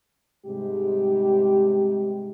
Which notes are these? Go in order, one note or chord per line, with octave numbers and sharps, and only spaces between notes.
G#2 C3 G3 G#3 G4